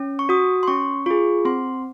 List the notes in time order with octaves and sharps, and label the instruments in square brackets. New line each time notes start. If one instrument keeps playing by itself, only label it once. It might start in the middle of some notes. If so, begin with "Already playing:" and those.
Already playing: [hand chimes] C#4
C#6
F#4 D#6
C6
C#4 C#6
F4 G#4 C#6
C4 C6